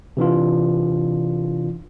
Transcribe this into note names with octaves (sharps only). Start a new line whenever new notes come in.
C3 E3 D4 F4